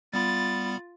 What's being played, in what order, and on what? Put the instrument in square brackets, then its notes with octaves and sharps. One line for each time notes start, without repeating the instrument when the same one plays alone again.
[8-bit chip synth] G3 B3 B5 [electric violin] F4 A6